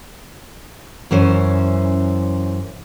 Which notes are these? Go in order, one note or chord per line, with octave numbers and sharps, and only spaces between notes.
F#2 E3 C#4 C5